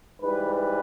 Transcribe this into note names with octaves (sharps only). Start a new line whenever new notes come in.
G#2 E3 G3 B4
B4